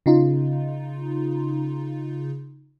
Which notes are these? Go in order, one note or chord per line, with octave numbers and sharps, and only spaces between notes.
C#3 D#4 F4